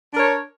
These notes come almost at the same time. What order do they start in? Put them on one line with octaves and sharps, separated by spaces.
D4 A#4 C#5